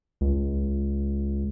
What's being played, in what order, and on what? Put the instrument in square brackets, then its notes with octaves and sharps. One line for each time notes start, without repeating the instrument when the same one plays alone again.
[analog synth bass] C#2